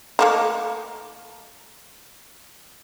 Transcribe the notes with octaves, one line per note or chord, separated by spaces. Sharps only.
A3 A#3 D#4